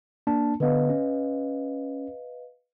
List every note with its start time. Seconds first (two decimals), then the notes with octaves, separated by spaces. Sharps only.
0.27 A#3 D4 A5
0.60 D3 B3 B4 D#5 F5
0.89 C#4